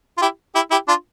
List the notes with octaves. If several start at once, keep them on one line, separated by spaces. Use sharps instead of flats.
F4
E4 G4
E4 G4
E4 G4
D4 F4